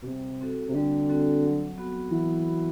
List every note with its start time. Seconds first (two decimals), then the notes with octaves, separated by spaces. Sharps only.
0.03 B2
0.07 C3 G3
0.41 C4 F#4 A4
0.69 C3
0.75 D3 G3
1.09 C4 F#4 A4
1.43 F#3
1.78 B3 F#4
2.11 E3 F#3
2.46 B3 F#4